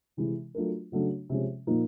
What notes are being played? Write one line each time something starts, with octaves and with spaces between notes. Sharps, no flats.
C3 E3 G#3
F#3 A3 D4 F4 A#4
C#3 F#3 A3 D4
C3 F3 G#3 C#4
A#2 F3 A#3 D#4